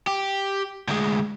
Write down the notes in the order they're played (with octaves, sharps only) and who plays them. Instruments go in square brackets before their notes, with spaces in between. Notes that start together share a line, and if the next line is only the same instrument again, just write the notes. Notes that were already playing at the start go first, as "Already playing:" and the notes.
[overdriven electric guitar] G4
D2 G#3